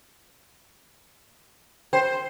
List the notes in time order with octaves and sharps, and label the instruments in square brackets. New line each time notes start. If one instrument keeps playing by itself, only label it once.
[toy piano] A#4 G5 [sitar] C5